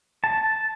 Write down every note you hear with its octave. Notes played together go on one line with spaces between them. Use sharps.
A5